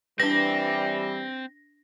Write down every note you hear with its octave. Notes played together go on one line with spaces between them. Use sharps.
E3 G3 C4 D4 B4 A#6